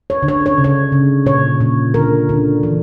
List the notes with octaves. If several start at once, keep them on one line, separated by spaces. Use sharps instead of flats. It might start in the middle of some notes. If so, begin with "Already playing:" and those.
C#5
D3
C#5
C#5
C#3
C#5
C#3
A#2 C#5
A#2
D3 A#4
D3
E3